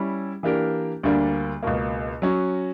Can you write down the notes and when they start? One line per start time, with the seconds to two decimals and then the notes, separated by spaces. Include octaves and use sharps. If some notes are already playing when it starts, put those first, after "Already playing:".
Already playing: G3 C#4 E4
0.43 E3 A#3 D4 G4 A#4
1.03 D2 D3 G3 A#3 D4
1.63 C#2 B2 A#3
2.22 F#3 C#4 F#4